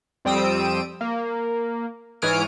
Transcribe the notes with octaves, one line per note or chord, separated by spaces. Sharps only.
F2 G3 C4 D#6 E6 D7
A#3
G#2 E3 C#5 D#6 F6 D7